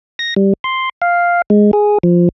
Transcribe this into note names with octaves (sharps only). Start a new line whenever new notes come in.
A#6
G3
C6
F5
G#3
G#4
F3